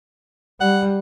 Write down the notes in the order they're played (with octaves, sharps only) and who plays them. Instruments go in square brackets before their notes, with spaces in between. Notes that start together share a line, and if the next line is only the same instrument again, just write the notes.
[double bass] G3 [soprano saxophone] F#5